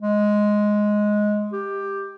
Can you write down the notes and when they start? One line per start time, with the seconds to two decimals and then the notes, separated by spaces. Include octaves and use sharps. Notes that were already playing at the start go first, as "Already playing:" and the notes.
0.01 G#3
1.53 G4